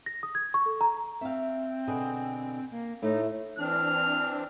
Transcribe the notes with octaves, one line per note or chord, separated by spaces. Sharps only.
A#6
D#6
G#6
C#6
A4
A#5
C4 E5 F5
B2 D3 G#4
A#3
A2 A3 D#4
E3 C4 D4 F6